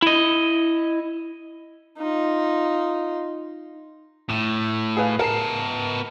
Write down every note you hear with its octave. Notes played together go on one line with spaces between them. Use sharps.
E4 D#5
D#4 F4
A2 E7
G#4 B4 F5
B3 A#4 A5 C7